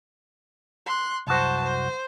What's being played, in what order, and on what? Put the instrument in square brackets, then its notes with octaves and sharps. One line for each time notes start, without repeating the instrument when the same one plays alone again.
[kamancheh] C6 F#6
[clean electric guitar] C2 F#2 F#4 [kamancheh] C5 A5
[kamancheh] C5